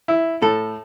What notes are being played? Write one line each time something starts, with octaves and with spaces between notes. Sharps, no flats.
E4
A2 A4